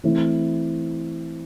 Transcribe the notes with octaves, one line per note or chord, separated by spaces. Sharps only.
E3 A3 C4 E4